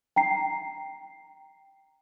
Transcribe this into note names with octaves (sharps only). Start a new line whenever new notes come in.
G5 A#5 C7